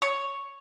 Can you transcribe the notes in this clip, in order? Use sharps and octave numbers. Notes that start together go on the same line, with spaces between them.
C#5